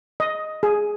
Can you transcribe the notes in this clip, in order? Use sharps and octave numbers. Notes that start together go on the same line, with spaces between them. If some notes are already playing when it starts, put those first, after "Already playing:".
D#5
G#4